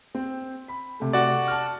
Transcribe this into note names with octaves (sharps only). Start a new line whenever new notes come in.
C4
B5
C3 A3
F#4 D5
A5 F6